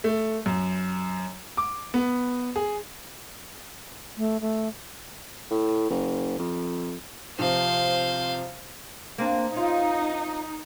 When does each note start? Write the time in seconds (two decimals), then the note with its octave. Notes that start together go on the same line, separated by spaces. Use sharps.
0.04 A3
0.46 F#2
1.57 D6
1.94 B3
2.56 G#4
4.18 A3
4.41 A3
5.51 A2
5.90 F#1
6.39 F2
7.39 C3 F3 C4 C5 F5
9.18 A#3 C4 D4
9.54 C#4 D#4 F4